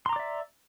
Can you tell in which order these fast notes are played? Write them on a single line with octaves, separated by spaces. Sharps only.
C6 A#5 D6 D5 E5